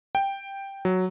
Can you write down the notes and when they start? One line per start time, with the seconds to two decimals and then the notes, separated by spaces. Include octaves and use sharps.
0.15 G5
0.85 F#3